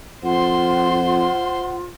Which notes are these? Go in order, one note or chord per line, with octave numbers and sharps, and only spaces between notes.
F2 F4 C5 F#5 C6